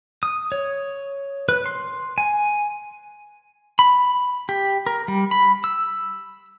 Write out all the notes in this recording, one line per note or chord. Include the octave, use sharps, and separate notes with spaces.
D#6
C#5
B4
C6
G#5
B5
G4
A#4
G3
B5
E6